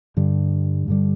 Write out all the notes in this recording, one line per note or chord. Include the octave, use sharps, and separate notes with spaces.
G2 D3 G3
G2 D3 G3